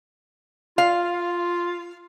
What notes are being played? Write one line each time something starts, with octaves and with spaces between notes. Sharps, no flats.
F4 F5